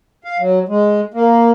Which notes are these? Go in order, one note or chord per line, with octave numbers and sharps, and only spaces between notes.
F5
F#3
G#3
A#3